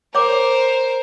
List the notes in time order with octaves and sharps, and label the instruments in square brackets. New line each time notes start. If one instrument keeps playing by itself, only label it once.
[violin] A#4 C5 [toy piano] C#5 G5 D6